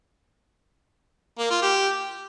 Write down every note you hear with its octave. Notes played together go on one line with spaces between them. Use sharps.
A#3
F4
G4